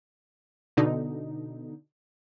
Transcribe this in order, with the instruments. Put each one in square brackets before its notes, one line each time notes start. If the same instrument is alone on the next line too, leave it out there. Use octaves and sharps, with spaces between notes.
[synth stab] B2 D3 D#4